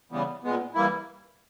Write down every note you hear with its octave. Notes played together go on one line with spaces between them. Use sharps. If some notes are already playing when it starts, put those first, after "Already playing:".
C#3 E3 G3 B3
A#2 G#3 B3
E3 G3 A#3 E4